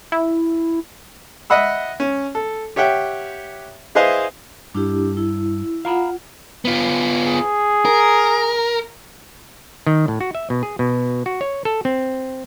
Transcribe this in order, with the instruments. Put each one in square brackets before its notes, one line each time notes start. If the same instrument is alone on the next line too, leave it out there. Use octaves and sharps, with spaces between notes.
[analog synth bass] E4
[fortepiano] D#5 E5 F#5 B5 E6
C#4
A4
G4 C#5 E5 F#5 G5
E4 G#4 B4 C5 D#5 F5
[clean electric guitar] G2 [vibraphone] D4 E4 G4
[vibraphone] E4
[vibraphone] F4 F#5 [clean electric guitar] F5 A#5 B5
[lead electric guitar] B3 F4
[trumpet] G#4
[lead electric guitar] A#4
[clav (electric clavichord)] D#3
A2
F#4
E5
B2
G#4
B2
F#4
C#5
A4
C4